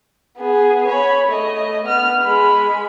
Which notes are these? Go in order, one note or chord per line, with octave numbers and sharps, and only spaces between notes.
B3 G#4
C#5 B5
A3 D#5
B3 F6
G#3 B5